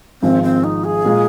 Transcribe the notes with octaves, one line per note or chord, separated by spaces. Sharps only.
G#1 G#2 F3 G#3 C4
C4
D#4
G#4
A#2 G#3 F4